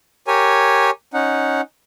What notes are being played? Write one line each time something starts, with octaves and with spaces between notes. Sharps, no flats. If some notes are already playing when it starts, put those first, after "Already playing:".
G4 A#4 C#5 G#5
C#4 D#4 F#5